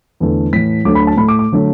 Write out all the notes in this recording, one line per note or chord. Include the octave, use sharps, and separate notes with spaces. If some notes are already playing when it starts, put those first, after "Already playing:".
E2 D3 A3
A2 E3 A3 B6
D2 D3 F#3 A3 D6
B5
A5
A2 A3 B5
D6
D6
D3 F#3 A3